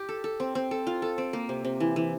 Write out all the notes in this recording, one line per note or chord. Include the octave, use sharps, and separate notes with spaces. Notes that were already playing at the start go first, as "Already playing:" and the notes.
Already playing: G4
A4
A4
C4
C4
A4
F4
A4
C4
A#3
C3
C3
E3
E3